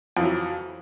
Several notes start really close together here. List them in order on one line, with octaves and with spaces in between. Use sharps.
F2 E3 F#3